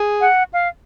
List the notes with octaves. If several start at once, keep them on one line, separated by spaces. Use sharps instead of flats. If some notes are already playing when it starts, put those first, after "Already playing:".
Already playing: G#4
F#5
F5